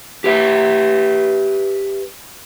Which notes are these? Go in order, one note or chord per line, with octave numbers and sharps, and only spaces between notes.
G4 B4 E5